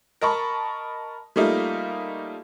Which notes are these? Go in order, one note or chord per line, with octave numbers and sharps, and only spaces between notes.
A#4 D#5 A5 B5 C#6
G3 A3 A#3 D#4 F4